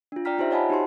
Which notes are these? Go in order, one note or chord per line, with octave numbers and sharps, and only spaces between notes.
D4 F4
D5 G5 A#5 F6 B6
D#4 F4 G4 C5 E5
C#5 D#5 F#5 G#5 A5 B5
D#4 F#4 G4 C5 C6